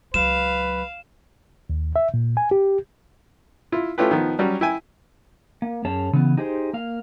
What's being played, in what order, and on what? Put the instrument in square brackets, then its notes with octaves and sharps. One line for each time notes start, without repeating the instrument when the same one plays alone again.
[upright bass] C#2 F#3 [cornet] B4 [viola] F5 [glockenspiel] E7
[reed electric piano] D#2
E5
A#2
G#5
G4
[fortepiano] E4 F4
A3 C#4 E4 F4 G4 B4
D#3 F3 B3
F#3 G3 C#4
E4 E5 G5 G#5
[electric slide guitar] A#3
F#2 C#4 G#4 C#5 A5
C#3 E3 B3
D#4 G4 G#4 B4 C5
A#3 F5